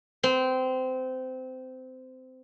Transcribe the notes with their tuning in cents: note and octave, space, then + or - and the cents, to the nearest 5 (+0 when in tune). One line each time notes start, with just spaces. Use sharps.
C4 -20